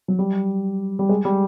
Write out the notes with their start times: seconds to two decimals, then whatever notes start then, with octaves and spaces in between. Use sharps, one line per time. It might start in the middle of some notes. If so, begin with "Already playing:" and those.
0.08 F#3
0.19 G3
0.99 G3
1.09 G#3
1.25 G3